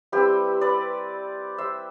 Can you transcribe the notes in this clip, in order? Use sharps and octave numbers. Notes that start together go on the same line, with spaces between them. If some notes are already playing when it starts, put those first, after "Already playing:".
G3 C4 E4 G4 B4
B4 D5
C5 E5